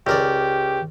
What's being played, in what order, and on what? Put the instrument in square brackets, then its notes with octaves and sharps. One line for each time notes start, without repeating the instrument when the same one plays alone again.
[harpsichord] C#2 A#4 D5 [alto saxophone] G4